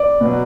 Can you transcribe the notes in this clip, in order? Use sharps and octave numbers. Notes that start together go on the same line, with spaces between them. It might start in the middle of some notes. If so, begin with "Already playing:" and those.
Already playing: D5
B2 F#3